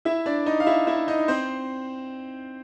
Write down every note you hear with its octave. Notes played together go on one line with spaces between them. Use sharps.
E4 E5
D4 D5
D#4 D#5
F5
E4 E5
E4 E5
D#4 D#5
C4 C5